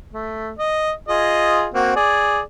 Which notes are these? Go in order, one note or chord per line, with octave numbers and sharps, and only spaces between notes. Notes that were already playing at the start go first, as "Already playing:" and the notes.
A3
D#5
F4 G#4 D#5
A#3 C4 F#4
G#4 D5